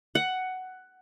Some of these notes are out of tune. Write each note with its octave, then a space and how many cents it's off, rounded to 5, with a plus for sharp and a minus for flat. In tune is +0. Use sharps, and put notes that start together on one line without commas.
F#5 +10